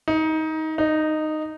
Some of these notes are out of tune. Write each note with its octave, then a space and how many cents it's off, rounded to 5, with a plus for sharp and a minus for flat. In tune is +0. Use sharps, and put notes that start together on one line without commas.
D#4 +20
D#4 -10